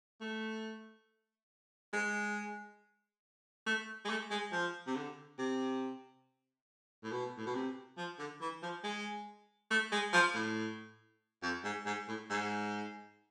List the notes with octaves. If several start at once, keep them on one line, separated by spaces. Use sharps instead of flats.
A3
G#3
A3
G#3
A3
G#3
F3
C3
D3
C3
A2
B2
A2
B2
C3
F3
D3
E3
F3
G#3
A3
G#3
F3
A2
F2
G#2
G#2
A2
G#2